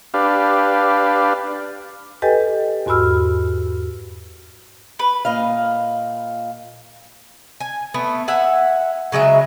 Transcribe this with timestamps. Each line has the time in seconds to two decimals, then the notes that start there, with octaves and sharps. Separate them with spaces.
0.14 D4 G4 B4 F5
2.22 G4 A4 B4 D#5 G5 G#5
2.86 E2 G#2 F#4 B5 E6 F6
4.99 B4
5.25 A#2 D#5 F5
7.60 G#5
7.94 A3 B3
8.28 E5 F#5 G#5
9.12 C#3 F#3 G#3 E5